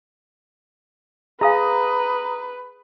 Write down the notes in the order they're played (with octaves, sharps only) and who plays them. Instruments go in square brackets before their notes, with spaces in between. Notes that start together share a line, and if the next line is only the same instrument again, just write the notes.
[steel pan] G#4 [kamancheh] B4 [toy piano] D#5 F5 [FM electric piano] A#5 D#6